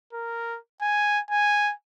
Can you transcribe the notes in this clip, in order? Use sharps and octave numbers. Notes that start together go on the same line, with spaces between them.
A#4
G#5
G#5